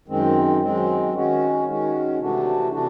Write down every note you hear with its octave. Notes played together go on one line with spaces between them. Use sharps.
F#2 D#3 G#3 C4
F#2 D#3 G#3 C4
D#3 G#3 C#4 F#4
D#3 G#3 C#4 F#4
C3 E3 A3 D4 F#4
C3 E3 A3 D4 F#4